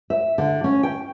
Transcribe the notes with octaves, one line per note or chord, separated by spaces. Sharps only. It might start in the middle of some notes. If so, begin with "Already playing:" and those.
E5
D3
C#4
G5